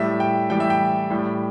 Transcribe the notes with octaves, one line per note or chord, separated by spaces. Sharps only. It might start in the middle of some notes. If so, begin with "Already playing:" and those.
Already playing: A2 G3 E5
G5
A2 E3 G3 G5
E5
G5
A2 G3